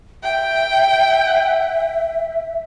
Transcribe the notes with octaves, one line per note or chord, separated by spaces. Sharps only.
E5 G5